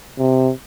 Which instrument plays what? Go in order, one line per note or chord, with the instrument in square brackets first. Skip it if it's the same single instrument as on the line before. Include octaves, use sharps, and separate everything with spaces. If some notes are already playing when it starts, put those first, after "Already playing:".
[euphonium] C3